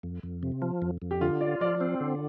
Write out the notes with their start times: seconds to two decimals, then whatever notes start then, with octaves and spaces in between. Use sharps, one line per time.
0.03 F2
0.23 F2
0.43 C3
0.62 F3
0.82 F2
1.02 F2
1.11 G4
1.21 D3 F4
1.41 F4 D5
1.61 F3 D5
1.81 C4
2.01 D3